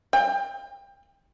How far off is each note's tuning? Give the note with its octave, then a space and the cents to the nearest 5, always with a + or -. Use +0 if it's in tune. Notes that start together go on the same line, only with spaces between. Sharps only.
G5 +25